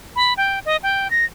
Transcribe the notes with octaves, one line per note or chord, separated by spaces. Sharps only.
B5
G5
D#5
G5
A#6